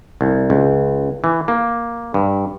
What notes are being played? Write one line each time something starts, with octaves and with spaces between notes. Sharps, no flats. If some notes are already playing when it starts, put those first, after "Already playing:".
C2
C#2
E3
A#3
G2